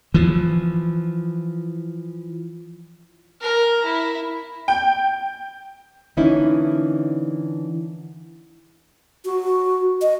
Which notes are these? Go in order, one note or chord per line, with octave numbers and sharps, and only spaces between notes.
E3 F3
A#4 A#5
E4
G5
D3 E3 A#3 C#4 D#4 E4
F#4
D#5